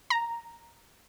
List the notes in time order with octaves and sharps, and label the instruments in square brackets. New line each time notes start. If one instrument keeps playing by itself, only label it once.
[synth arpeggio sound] A#5